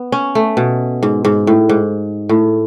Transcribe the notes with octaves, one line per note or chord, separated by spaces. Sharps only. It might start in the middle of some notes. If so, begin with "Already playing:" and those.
Already playing: B3
C#4
A3
B2
G#2
G#2
A2
G#2
A2